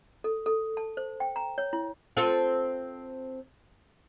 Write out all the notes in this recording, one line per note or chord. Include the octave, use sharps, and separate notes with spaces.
A4
A4
A5
C5
G5
A#5
C#5
E4
C4 F4 A4